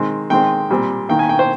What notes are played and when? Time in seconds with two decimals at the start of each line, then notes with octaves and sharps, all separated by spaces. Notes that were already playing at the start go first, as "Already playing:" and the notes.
Already playing: D#3 G#3 C4
0.30 D#3 G#3 C4 G5
0.70 A#2 G3 C4
1.09 D#3 A#3 G5
1.19 G#5
1.29 G5
1.39 C5